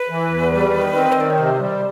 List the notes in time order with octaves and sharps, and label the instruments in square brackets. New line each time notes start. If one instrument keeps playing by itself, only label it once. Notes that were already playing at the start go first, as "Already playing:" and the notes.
Already playing: [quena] B4
[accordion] E3
E2
G3
D#3
C4
[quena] D#5
[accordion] D#3 [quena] D5
[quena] C#5
[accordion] C3 [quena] C5
[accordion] G3